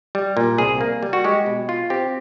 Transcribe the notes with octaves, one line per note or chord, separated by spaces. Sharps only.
G3
A#2
C2 G#4
A#3
G3
F#4
G#3 G4
B2
F4
C4 G4